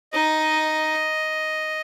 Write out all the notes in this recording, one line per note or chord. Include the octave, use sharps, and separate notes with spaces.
D#4 D#5